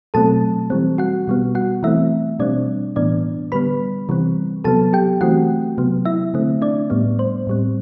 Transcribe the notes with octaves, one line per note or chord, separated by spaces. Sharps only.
B2 F#3 A3 C4 A4 A5
E3 G3 C4
F#4 F#5
B2 G3 B3
F#4 F#5
E3 A3 C4 E4 E5
B2 G3 C4 D4 D5
A2 E3 B3 D4 D5
D3 G3 B3 B4 B5
C3 E3 G3 C4
C3 F#3 B3 A4 A5
G4 G5
E3 A3 C4 F#4 F#5
C3 F#3 B3
E4 E5
D3 A3 C4
D4 D5
A2 G3 B3
C5
A2 G3 C4